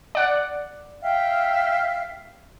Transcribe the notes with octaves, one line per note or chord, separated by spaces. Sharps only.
D5 F#5
E5 F5 G5